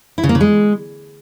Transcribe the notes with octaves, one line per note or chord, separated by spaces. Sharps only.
E4
C#3
A#3
C#3
G#3